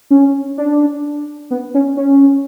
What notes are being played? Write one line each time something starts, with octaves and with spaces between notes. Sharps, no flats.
C#4
D4
B3
C#4
C#4